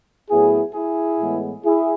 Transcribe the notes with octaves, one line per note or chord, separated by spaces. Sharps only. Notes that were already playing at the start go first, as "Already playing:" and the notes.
A2 F#3 B3 E4 G#4
E4 G#4
A2 E3 G#3 B3
E4 G#4